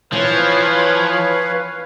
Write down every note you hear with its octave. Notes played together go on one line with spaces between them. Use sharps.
E3 F3 B4 C#5 F5